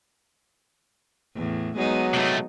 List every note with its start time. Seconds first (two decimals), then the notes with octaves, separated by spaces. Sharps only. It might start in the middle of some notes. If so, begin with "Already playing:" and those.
1.35 E2 A2
1.78 F#3 G#3 B3 D#4
2.14 C3 A3